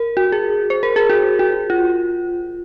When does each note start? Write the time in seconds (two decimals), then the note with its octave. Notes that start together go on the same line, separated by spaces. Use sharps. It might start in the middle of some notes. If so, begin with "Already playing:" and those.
Already playing: A#4
0.17 F#4
0.32 G#4
0.70 C5
0.83 A#4
0.96 G#4
1.10 F#4
1.39 F#4
1.70 F4